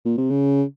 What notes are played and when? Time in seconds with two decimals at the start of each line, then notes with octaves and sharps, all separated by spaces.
0.05 A#2
0.17 C3
0.30 C#3